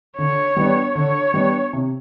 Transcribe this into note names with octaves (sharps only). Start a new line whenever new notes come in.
D3 C#5
G3 B3 D4
D3 C#5
G3 B3 D4
C3